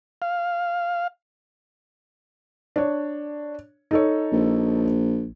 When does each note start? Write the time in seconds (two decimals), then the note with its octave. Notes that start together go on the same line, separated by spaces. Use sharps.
0.22 F5
2.76 D4 C#5
3.91 D#4 A4 C#5
4.32 A#1